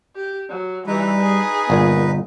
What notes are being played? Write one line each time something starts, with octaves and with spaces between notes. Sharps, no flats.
G4
F#3
E3 G3 D#4 B4
G#4
G1 A#2 A#3 G#5